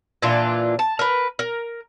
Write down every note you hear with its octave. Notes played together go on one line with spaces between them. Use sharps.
A#2 E3 D4 F4
A5
A#4 B4
A#4